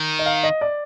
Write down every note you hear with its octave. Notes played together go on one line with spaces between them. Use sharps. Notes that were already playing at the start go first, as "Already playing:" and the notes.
Already playing: D#3
D#5
F5
D#5
D5